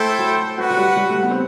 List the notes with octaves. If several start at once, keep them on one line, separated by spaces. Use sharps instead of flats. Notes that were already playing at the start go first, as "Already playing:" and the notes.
Already playing: A3 E4 A4 C5 E5 G5
F#3
F#3 F#4 B4 F#5
F#3
G3
G3
A3
B3
C4